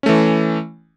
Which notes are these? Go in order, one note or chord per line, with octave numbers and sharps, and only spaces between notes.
E3 A3 C#4